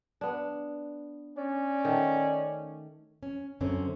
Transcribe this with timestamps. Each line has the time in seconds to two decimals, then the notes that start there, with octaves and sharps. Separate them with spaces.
0.21 B3 D4
1.38 C#4 D5
1.85 D#3 A3
3.23 C#4
3.61 F#2 D3 C4 C#4